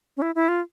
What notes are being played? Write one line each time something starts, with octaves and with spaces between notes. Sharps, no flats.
C#4
E4
E4
F4